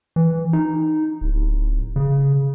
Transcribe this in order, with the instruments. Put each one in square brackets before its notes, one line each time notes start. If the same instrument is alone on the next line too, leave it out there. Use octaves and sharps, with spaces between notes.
[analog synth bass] E3
D#4
D1
C#3